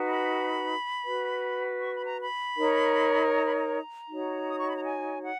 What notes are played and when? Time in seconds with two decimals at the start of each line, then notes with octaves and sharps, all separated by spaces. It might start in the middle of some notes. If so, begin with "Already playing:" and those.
Already playing: D#4 F#4 B4
0.09 B5
1.04 F#4 B4
1.80 C#6
1.94 B5
2.07 A#5
2.20 B5
2.57 D#4 A#4 C#5
3.33 A#5
3.45 B5
3.58 A#5
4.09 D#4 F#4 C#5
4.50 D#6
4.58 C#6
4.67 B5
4.76 A#5
4.85 G#5
5.23 F#5